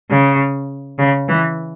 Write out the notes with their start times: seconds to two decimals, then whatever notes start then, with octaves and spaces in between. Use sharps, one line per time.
0.11 C#3
0.99 C#3
1.28 E3